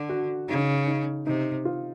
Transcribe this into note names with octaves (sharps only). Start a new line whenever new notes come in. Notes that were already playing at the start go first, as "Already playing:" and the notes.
Already playing: D3
F#4
C#3 D#4
D#4
C3 D#4
F4